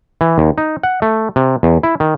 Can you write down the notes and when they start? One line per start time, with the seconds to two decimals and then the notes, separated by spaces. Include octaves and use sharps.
0.21 E3
0.38 D#2
0.58 D#4
0.83 F#5
1.02 A3
1.36 C3
1.63 E2
1.83 E4
2.00 D#3